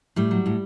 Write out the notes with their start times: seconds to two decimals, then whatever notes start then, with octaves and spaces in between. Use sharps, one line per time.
0.16 A2 G3
0.31 F#3
0.46 A2